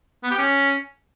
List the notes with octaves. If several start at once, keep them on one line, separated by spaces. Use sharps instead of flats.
B3
G4
C#4